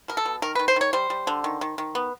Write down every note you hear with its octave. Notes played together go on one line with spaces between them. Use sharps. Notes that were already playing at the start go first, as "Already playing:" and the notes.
B2 A#4
A4
B2
D#3 A#4
D#3 B4
C5
D#3 C#5
G3 C5
G3
D3
D#3
D#3
D#3
B3